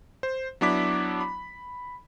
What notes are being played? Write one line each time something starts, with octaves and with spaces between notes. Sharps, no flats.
C5
F#3 B3 D4 E4 D6 B6
B5